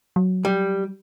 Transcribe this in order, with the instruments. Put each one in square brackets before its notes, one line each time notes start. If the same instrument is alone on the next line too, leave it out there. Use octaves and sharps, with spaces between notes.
[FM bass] F#3
[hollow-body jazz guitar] G3